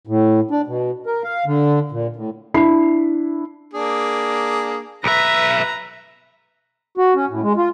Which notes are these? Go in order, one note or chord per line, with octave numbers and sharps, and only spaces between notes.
A2
D4
B2
A#4
F5
D3
A#2
A2
D4 E4 B5 C7
A#3 D4 G#4
B1 B4 E5 A#5
F#4
C#4
A2
G#3
F4